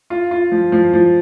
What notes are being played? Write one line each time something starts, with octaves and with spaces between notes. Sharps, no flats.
F4
F4
F3
F3
F3